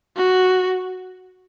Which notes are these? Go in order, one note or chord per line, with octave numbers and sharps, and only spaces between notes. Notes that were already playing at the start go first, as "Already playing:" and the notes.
F#4